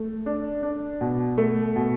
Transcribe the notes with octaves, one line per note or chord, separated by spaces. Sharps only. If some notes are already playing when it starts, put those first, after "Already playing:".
Already playing: A3
D4
D4
B2
A3
B2